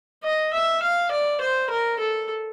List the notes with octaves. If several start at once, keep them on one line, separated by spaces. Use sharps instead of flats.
D#5
E5
F5
D5
C5
A#4
A4